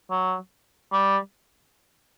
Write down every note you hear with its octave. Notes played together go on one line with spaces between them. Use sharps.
F#3
G3